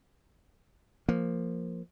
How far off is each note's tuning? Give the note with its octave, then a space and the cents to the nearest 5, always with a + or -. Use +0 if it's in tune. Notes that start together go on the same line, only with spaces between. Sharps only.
F3 +0 A#3 +0